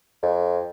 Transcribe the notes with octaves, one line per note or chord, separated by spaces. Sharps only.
F2